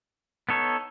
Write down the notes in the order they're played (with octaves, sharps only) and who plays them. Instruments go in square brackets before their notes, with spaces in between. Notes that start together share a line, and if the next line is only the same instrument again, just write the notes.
[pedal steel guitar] B3 D#4 A4 C#5